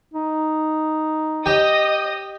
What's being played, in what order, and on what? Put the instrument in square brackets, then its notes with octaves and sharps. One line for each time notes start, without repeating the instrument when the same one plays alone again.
[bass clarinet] D#4
[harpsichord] G4 [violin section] D#5 D#6